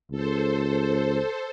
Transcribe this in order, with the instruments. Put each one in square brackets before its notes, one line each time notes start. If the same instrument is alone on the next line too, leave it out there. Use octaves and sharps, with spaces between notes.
[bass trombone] C#2 [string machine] A4 C5